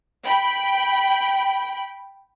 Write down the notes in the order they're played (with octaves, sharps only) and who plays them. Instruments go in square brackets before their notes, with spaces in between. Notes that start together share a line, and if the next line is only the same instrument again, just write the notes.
[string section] G5 B5